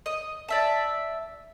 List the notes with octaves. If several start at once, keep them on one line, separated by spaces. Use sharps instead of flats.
D#5
D5 E5 A5